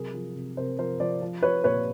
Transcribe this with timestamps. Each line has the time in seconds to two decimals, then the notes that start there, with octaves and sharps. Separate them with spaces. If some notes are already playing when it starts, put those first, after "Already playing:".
Already playing: C3 F#3 G#4 A#4
0.14 F3
0.35 C3
0.57 C3 A#4 C5
0.79 F3 A#4 C5
1.00 F3 C5 D5
1.22 F3
1.43 F3 B4 C#5
1.64 A#2 B4 C#5